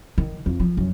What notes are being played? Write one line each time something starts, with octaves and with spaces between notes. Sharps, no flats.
D#3
F2
F3
F#2